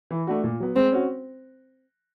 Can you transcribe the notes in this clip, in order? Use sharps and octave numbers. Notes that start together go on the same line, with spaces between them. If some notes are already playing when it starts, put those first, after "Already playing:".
E3
A3 D4 F#4
A#2
F#3 B3
G#3 C4
C#4 F#4